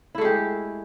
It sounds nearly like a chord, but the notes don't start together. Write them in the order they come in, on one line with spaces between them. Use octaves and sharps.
E4 A3 G#3 G4